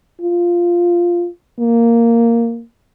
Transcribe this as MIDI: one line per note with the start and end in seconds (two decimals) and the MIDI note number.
0.21 1.28 65
1.60 2.63 58